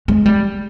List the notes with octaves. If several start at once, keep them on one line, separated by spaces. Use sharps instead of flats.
G#3
G3